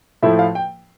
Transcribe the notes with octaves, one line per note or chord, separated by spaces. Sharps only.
A2 F3 A3 E4 E5
F5
G5